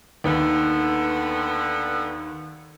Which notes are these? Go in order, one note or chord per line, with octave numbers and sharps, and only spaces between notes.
D#2 D3 D#3 B3